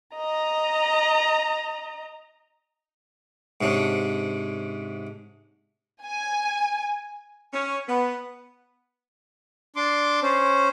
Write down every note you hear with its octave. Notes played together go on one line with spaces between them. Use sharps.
D#5 A#5
G#2 C3 C#4 D4
G#5
C#4
B3
D4 C6 D6
C#4 C5